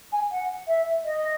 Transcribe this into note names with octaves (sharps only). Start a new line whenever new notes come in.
G#5
F#5
E5
D#5